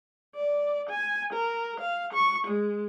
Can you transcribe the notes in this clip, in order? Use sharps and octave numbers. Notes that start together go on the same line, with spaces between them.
D5
G#5
A#4
F5
C#6
G#3